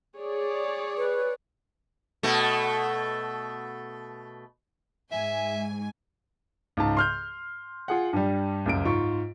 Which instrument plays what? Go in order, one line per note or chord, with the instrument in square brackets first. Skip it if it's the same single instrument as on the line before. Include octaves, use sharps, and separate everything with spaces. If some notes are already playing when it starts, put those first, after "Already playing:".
[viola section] G#4 C#5 D5
[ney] B4
[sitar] B2 A3
[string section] G#2 G#5 [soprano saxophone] E5
[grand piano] C#2 G#2 A5
C6 F6 G6
F4 G#4 F#5
G2 G3
C#2 F#2 D7
G#2 F4 C#6